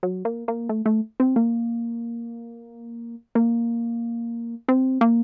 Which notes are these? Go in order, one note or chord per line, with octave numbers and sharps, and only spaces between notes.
F#3
A#3
A#3
A3
A3
C4
A#3
A#3
C4
A#3